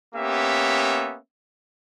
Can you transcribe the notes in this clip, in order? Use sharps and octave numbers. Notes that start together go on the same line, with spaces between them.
A#3 B3 C#4 G4 E5